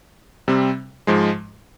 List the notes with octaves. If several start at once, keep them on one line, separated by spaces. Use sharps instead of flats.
C3 G3 C4
G#2 F3 G#3